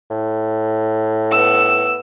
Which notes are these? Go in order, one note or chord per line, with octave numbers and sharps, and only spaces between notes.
A2
B3 E6